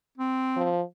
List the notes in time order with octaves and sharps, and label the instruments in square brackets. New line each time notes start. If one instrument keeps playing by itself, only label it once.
[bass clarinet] C4
[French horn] F3